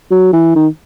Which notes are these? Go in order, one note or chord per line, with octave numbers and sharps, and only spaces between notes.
F#3
E3
D#3